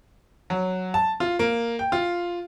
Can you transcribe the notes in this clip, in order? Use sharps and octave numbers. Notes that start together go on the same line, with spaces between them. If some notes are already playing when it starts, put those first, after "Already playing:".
F#3
A5
F4
A#3
G5
F4